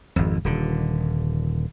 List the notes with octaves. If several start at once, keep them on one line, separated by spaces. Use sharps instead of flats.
G#1 F2
D#1 D3